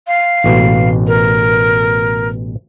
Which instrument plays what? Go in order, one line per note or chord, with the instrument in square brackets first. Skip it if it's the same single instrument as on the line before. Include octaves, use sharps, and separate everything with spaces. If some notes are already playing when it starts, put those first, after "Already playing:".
[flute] F5
[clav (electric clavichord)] A1 B2
[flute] A#4